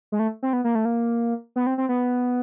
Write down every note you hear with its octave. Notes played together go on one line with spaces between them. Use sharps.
G#3
A3
C4
B3
A#3
A3
A#3
B3
C4
C4
B3